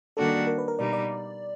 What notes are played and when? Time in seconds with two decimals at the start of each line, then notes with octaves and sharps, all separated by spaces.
0.17 D#3 G3 A#3 D4 F#4 A4
0.47 A#4
0.58 B4
0.68 A#4
0.79 B2 G3 A#3 D#4 D5
0.93 D5